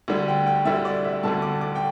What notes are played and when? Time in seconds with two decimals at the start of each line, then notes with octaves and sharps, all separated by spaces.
0.08 D2 D3 G3
0.28 G5
0.47 G5
0.65 D2 D3 G3 E5
0.85 D5
1.04 E5
1.23 D2 D3 G3 A5
1.42 D6
1.61 D6
1.75 G5